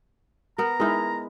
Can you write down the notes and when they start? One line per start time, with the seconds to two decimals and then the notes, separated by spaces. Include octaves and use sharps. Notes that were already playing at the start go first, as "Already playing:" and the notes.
0.58 B3 A#4 A#5
0.80 G#3 D#4 E4 A#4